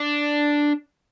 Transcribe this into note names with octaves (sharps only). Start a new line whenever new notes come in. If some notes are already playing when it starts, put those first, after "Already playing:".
Already playing: D4